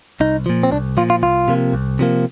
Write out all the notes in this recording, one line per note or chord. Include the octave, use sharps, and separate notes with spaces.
C2 D#4
A#2 F3
C4
C2 D4
A#2 F3 F4
F4
C2 F4
C3 F3 A#3
C2
C3 F3 A#3